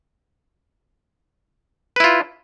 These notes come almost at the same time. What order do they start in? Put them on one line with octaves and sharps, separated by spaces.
B4 E4 F4